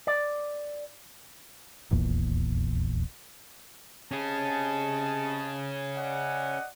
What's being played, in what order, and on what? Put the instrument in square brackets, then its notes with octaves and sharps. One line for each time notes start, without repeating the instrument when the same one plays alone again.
[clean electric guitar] D5
[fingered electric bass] D#1 A#1 E2 A#2
[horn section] C3 D#5 A5 [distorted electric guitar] C#4 G#4
[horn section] D5 D#5 F#5